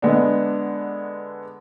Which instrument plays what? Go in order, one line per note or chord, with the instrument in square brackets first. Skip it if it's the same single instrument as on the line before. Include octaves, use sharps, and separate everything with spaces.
[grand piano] D3 G#3 B3 D4